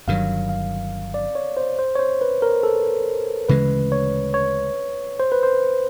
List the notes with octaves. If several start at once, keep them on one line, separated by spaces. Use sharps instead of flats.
G1 G2 D#3 F#3 F5
F5
D5
C#5
C5
C5
C#5
C5
B4
A#4
A4
D2 C#3 E3 G#3 B4
C#5
C#5
C5
B4
C5